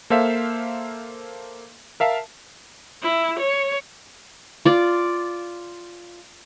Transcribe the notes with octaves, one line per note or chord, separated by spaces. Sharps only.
A#3 A4 C5 E5 F5
A#4 E5 F5 A5
E4
C#5
F4 D5